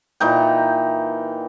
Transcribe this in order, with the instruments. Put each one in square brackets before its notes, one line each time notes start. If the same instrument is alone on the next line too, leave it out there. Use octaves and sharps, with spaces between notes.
[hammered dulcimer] A#2 E3 D#4 G5